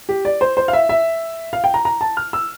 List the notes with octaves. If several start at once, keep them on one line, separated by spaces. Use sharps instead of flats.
G4
D5
C5
C5
F5
E5
E5
F5
G5
A#5
A#5
A5
F6
E6